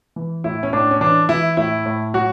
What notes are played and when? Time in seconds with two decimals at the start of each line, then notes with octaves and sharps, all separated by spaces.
0.16 E3
0.44 A2 E4
0.63 C#4
0.73 A2 D4
0.91 C#4
1.01 E3 D4
1.29 E3 E4
1.57 A2 E4
1.86 A2
2.14 F#3 F#4